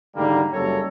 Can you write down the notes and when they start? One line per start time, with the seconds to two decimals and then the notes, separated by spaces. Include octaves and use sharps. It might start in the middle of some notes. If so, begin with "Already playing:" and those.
0.16 G#2 D3 D#3 G3 A#3
0.52 F#1 F#2 G3 A4 C#5 A#5